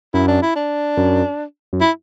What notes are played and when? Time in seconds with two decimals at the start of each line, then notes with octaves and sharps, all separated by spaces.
0.14 F#2 E4
0.28 D4
0.42 E4
0.56 D4
0.97 F#2
1.73 F#2
1.81 E4